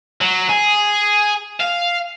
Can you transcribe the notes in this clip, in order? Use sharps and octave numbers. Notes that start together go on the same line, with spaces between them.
F#3
G#4
F5